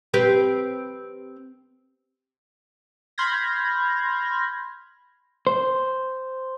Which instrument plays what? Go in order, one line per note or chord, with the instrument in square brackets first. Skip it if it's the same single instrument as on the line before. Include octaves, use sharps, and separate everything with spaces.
[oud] C4 G4 B4
[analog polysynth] B5 C6 F6 G6 G#6 A#6
[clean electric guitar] C5